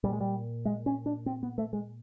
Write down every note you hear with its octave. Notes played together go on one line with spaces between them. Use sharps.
A#2 G3
G#3
G3
G#3
C#4
D4
C4
B3
A3
G#3